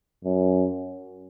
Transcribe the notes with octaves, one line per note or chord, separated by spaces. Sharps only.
F#2